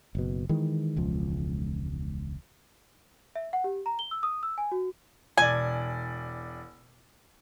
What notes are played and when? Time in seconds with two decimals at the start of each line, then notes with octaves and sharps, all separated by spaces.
0.15 F#1 B2
0.49 D#3 E3 G#3
0.96 E1 C#2 F3
3.36 E5
3.53 F#5
3.64 G4
3.86 A#5
3.99 G7
4.11 E6
4.23 D#6
4.43 E6
4.58 G#5
4.72 F#4
5.37 E1 D5 G#5